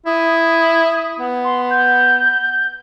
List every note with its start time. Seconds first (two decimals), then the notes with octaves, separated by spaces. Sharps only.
0.06 E4 D#6
1.18 B3
1.44 C6
1.70 G6